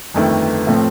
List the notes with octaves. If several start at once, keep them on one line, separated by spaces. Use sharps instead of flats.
G1 F2 D#3 A3
A2 F3 A3 C4